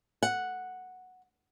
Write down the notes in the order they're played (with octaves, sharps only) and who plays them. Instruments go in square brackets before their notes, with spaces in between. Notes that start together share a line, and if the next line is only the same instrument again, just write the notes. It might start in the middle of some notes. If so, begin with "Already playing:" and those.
[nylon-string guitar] F#5